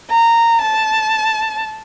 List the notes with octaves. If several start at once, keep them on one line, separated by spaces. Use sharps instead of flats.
A#5
A5